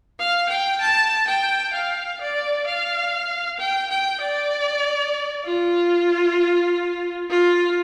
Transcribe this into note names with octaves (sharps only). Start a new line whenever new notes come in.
F5
G5
A5
G5
F5
D5
F5
G5
G5
D5
F4
F4